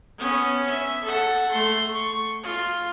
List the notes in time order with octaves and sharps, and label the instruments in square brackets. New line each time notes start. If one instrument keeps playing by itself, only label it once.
[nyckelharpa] B3 C#4
E5
A4 F#5
A3 C6
C#6
F4